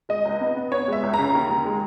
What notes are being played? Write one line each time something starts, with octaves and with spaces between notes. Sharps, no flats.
G#3 D#5
C#2
B3
B3
B3 C#5
G#3 E5
C#2
A#5
C#3
D#2
D#2
G#3